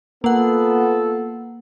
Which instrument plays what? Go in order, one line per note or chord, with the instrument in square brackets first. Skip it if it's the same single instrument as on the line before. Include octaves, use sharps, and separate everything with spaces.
[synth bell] A#3 F#5 [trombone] B3 [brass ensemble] F4 A4